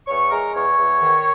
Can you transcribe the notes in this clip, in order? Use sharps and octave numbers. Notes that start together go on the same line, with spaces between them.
E2 C#5 C#6
G#3 A#4 A#5
E2 C#5 C#6
E2
D#3